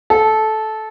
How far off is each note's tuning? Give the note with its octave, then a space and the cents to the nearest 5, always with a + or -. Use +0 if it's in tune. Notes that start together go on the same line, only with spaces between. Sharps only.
A4 -15